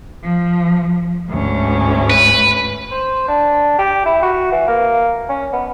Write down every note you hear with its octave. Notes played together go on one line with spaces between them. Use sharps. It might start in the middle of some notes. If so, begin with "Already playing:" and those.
F3
D2 G#2 C#4
B4
C5
D4
G4
E4
F#4
E3
A#3
C#4
B3